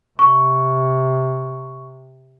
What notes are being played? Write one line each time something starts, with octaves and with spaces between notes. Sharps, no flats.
C3 C#6